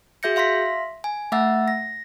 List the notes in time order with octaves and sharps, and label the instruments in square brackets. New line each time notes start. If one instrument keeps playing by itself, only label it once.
[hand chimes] F#4 G#4 E5 G6 A#6 C#7
E5 F5 C6 A#6 B6
G#5
A3 E5 F#5 E6 A6
A#6